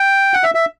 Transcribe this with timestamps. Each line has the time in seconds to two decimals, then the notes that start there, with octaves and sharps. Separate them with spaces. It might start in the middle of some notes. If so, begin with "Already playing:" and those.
Already playing: G5
0.34 F#5
0.43 E5
0.55 E5